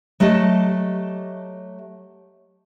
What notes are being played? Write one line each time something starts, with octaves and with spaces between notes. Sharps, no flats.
F#3 A3 G4 D#5 A5